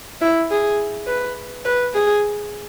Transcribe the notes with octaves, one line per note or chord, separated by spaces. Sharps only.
E4
G#4
B4
B4
G#4